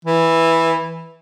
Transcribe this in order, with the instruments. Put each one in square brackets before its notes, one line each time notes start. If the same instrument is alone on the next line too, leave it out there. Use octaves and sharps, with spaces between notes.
[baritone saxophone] E3